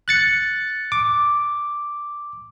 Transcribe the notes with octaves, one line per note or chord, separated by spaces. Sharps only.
F#6 A6 C#7
D6